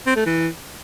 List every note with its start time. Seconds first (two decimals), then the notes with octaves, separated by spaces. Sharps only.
0.06 C4
0.16 A3
0.26 E3